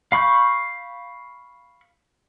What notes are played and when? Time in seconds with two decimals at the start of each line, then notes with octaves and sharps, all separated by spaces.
0.12 F5 B5 C#6 G6